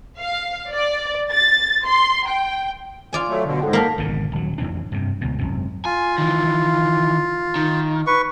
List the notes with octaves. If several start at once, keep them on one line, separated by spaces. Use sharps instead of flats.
F5
D5
A6
C6
G5
F4 D5 G#5
F#3 A3
B2 D3
G#2 A4 F#5 G5
A#3 A#4 A5 G6 B6
G#1 G#2 B2 D3
D#1 F#3
F2 A2 E3 D4
G2 C3
C#2 B2
G#1 F#2 C3
F4 G#5
D#3 E3
D#3
B4 C#6